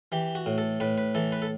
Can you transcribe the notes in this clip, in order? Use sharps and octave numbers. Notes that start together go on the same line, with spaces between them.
E3 G4
F#4
A2
A4
A2 B4
B4
E3 A4
B4
A4